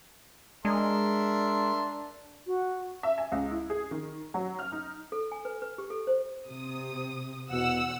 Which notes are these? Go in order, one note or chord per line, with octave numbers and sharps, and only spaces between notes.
G#3 D4 A#4 E5 C6
F#4
E5
G#5
C#2
E4
G#4
D#3
F#3
F6
D#4
A4
G#5
B4
B4
G4
A4
C5
C3 D#6
E2 B2 F#5 E6